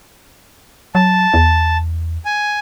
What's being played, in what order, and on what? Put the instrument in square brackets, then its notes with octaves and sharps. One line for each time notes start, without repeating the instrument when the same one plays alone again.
[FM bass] F#3 [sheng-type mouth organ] A5
[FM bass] E2
[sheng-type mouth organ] G#5